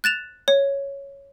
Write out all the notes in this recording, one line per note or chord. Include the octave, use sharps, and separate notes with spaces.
F#6 A6 E7 F7
C#5